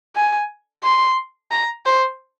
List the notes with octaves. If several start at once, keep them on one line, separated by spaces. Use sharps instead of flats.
G#5
C6
A#5
C5